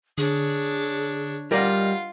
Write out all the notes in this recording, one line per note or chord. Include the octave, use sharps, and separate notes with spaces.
D3 D4 G#4 C#5
G3 F4 A#4 D5 D#5 F5 F#5